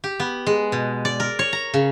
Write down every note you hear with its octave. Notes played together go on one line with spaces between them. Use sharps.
G4
B3
G#3
B2
D5
A#4
C#5
A#5
C#3